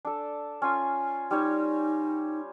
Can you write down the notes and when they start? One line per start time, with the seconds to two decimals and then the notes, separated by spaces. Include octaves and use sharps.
0.05 D4 A4
0.62 C#4 F4 G#5
1.31 G3 D#4 C#5